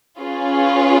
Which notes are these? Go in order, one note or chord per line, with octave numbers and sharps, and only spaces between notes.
C#4 F4 G#4 B4